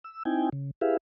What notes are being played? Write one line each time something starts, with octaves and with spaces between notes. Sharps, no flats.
E6
C4 D#4 E4 G5 G#5
C#3
E4 G4 G#4 B4 E5 F5